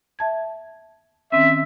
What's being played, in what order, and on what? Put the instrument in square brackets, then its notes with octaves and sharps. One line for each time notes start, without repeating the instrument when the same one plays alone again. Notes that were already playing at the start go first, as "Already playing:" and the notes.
[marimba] E5 A5 G#6
[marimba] D#3 C4 C#4 [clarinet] E5